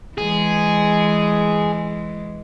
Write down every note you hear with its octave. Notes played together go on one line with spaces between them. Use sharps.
E3 G#3 G#4